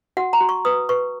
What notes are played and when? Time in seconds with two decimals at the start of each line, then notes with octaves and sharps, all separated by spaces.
0.17 F#4 F#5
0.33 A#5
0.41 F#4
0.49 C#6
0.65 B4 D#6
0.89 B4 C#6